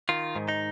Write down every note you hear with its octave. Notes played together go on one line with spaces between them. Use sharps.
D#3 F4
G#2
D#4